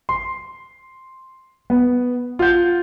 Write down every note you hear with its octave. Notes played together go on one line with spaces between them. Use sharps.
C6
B3
F4 F#5 G6